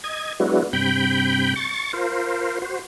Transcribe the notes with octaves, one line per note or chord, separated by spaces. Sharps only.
D#5 G#6
F#3 G#3 B3 D4 E4 F#4
G2 C3 G5 B5 G6
C#6 A6
F4 A#4 C5
F#4 C5